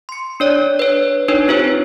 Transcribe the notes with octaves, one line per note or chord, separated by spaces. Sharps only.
C6 C#7
D4 C#5 D5
B4 C#5
D4 D#4 B4 C#5
C4 D#4 F4 G4 C5 C#5